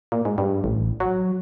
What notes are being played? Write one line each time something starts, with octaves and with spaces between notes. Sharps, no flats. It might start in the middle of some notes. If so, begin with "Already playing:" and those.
A#2
G#2
G2
A1
F#3